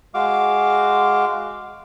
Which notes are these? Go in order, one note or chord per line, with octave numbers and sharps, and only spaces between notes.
G#3 F#4 F5 D6